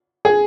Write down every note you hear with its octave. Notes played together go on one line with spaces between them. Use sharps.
G#4